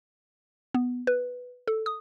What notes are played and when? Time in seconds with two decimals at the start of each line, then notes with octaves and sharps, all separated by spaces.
0.74 B3
1.07 B4
1.68 A4
1.86 D#6